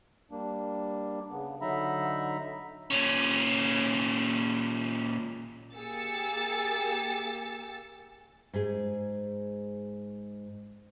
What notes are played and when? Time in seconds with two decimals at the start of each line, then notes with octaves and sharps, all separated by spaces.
0.31 G3 A#3 D4
1.31 C#3 B3
1.61 D3 F#3 D#4 E5 A#5 B5
2.91 A#2 C#4
5.76 A#3 G4 G#4 E6 A6 C#7
8.53 G#2 G#4